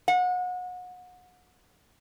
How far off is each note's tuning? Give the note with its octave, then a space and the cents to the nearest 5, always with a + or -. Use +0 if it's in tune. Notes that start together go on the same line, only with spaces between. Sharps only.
F#5 -30